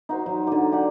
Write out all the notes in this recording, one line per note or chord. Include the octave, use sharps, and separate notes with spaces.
D#4 F#4 C5
F#3
D3 D6
G4 F#5